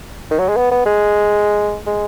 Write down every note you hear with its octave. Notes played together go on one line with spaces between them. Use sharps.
D#3
F#3
G#3
B3
B3
G#3
G#3